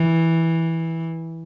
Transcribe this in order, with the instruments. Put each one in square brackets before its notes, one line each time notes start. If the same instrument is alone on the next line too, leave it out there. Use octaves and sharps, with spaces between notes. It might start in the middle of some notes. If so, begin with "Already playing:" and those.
Already playing: [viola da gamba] E3